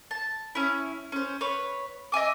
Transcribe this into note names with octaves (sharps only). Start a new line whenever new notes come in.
A5
C#4 E4
C#4 C5
B4 C#5 C#6
D#5 E5 G#5 D6